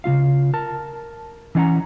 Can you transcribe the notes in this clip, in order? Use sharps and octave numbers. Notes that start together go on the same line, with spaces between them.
C#3 G3 F4 F5
A#4 A5
E3 A3 C#4 F5 F#5 A#5